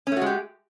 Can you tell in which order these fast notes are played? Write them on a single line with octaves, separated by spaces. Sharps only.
C#4 A3 F#4 G#3 G4